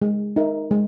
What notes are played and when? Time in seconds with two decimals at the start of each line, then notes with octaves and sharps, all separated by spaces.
0.02 G#3
0.36 D#4 A#4 E5
0.71 G#3